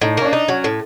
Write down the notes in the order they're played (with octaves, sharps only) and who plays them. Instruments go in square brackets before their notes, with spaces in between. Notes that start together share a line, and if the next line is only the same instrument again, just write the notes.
[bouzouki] A2 [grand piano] D#4
[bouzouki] A#3 [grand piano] C#4
[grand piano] D4
[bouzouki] D#4
[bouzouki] F#3 [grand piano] C#4
[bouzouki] A2